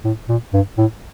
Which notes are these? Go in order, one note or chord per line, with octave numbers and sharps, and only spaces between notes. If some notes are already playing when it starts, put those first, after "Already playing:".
A2
A#2
G2
A2